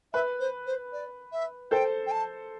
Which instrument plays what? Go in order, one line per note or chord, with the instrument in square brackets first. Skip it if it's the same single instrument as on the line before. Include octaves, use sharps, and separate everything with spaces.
[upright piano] B4 [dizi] E5
[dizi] C5
C5
D5
E5
[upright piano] A4 C5 [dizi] G5
[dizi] G5
A5